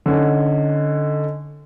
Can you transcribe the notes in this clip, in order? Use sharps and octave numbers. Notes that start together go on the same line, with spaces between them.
D3 C#4 D#4